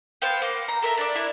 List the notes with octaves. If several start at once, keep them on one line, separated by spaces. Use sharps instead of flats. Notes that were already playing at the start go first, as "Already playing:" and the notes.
B3 C5 F5 G5
A#3
A#5
A4 A#4 E5
D4 D5
E4 A#4